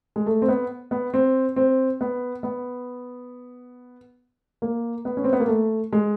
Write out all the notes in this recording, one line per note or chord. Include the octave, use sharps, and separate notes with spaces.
G#3
A3
C4
B3
B3
C4
C4
B3
B3
A#3
B3
C#4
C4
B3
A#3
A3
G#3